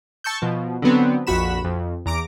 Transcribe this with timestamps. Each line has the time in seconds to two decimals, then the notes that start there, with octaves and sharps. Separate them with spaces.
0.24 A5 C#6 E6 G6
0.42 B2 F3
0.82 D3 F#3 B3 C4
1.27 A#1 F2 F#4 B5 E7
1.64 F2
2.06 E2 A#5 D6 D7